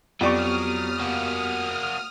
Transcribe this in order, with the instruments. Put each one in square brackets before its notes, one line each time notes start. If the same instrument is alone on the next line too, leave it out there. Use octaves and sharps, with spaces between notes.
[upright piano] F2 D5 C#6 [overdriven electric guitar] F#3 [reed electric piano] B3 G4 [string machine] D#6 F6
[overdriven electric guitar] A#3 F#4